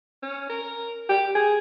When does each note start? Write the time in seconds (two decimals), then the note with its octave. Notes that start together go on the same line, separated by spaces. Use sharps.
0.23 C#4
0.50 A#4
1.10 G4
1.35 G#4